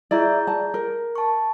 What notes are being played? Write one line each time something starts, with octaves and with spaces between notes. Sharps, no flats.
E4 G#4 D5 A#5 G6
D5 A5
A#4
A5 C#6